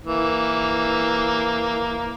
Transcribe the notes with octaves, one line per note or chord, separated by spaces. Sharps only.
E3 A#3